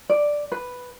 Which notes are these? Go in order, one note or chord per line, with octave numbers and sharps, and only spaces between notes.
D5
B4